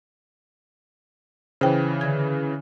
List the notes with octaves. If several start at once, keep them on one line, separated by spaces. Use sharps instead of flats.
C#3 E3 C5 G5
D3 G#6